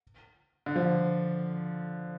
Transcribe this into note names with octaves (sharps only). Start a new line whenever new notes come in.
D3
F3